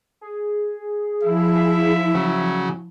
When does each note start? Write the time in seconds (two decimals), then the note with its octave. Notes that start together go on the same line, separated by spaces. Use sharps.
0.21 G#4
1.23 F3 E4 E5
2.14 C#3 F#3